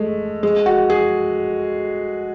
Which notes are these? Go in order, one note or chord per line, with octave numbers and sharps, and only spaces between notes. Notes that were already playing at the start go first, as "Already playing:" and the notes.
Already playing: G#3 A3
G#3
F#4
G#4